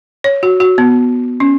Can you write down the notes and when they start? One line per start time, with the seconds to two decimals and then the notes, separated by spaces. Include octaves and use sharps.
0.24 C#5
0.43 F#4
0.60 F#4
0.78 B3
1.40 C#4